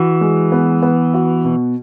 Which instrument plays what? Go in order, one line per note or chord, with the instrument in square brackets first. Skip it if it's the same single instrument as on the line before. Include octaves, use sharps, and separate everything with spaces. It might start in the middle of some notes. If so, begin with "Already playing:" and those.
Already playing: [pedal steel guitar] E3 [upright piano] F#4
[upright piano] G#3
B3
B3
F#4
B2